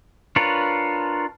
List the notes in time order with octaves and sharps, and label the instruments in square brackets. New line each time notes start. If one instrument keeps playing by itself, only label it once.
[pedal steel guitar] D4 F4 A#4 B4 C#5